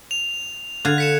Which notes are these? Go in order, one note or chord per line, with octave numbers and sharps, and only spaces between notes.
F7
D3 F5 F#6 G#6
B6 C#7 E7